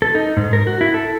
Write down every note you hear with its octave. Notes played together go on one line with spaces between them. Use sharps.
A4
D#4
G#2
A#4
F#4
E4
A4